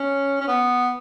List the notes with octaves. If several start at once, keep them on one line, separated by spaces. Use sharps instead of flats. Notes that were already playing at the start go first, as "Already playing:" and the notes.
Already playing: C#4
C#4
B3